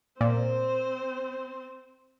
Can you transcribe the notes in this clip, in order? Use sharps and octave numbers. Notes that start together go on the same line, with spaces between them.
A#2 C4 C5